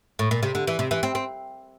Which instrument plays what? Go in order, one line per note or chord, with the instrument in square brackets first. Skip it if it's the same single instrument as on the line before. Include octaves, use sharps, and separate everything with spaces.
[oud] A2
A#2
C3
D3
E3
C3
E3
C4
C4